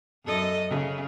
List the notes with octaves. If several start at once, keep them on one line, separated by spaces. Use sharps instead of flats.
F#2 A4 D#5
C#3